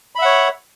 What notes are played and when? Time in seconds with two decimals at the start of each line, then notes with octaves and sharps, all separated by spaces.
0.15 B5
0.19 E5
0.22 F#5
0.25 C#5